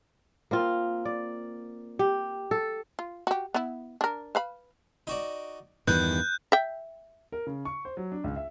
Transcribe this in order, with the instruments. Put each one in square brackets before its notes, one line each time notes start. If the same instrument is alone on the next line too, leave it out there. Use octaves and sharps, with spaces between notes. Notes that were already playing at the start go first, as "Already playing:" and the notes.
[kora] A#3 C4 F4
D5
G4
A4
[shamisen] F4
F#4 G4
B3 E4
D4 A#4
B4 F5 B5
[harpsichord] D#4 F#4 D5
[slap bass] E2 G2 D#3 [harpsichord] B3 [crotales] F#6 G6
[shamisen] E5 G5
[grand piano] A#4
C#3
C#6
C5
F#3
D4
C#2
E5